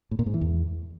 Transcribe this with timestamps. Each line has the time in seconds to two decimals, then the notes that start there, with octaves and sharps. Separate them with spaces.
0.11 A2
0.19 A#2
0.26 G#2
0.34 E3
0.41 E2